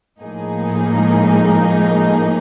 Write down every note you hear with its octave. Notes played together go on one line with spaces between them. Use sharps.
A2 F3 A#3 D#4 G#4
G#3